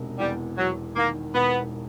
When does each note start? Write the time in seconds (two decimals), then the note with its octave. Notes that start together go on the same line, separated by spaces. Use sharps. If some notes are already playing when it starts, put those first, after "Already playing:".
Already playing: E1 C3 D#3
0.19 E2 G3
0.57 E2 F#3
0.96 D#3 A#3
1.34 E1 B3